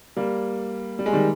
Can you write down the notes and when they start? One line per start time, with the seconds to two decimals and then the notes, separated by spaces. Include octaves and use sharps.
0.17 G3 A#3
0.99 G3
1.06 G#3
1.13 D#3 G3